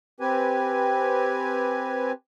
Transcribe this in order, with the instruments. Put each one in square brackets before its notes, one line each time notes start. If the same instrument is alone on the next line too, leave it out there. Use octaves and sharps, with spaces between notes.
[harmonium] C4 G4 B4 G#5